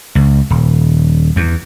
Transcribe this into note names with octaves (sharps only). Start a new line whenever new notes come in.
C#2
D#1
E2